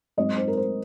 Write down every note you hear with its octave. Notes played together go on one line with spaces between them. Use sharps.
G#2 F#3 C4 D#5
C5
A#4
C5